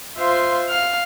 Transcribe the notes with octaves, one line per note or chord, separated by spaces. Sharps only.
F4 C5 E5 F5 C6
F5 F6